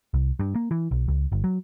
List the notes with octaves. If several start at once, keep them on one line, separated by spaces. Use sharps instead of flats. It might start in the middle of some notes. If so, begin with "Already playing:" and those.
C2
G2
A#3
E3
B1
C#2
G1
F#3